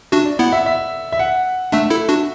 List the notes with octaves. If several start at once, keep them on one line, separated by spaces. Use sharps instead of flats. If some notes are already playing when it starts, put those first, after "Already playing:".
D4 F#4 E5
D5
B3 E4 F#5
E5
E5
E5
F#5
A3 D4 E5
E4 A4
D4 F#4